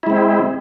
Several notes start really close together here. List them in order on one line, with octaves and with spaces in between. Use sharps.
E4 G#3 C4